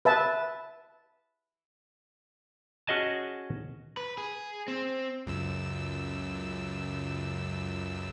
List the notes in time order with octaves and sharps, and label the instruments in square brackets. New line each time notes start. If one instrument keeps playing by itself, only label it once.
[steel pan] B4 E5 A5
[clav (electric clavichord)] C#4 F#4 G#4 D#5 G#5 A5
[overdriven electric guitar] B4
G#4
C4
[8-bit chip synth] C#2 F#2 E6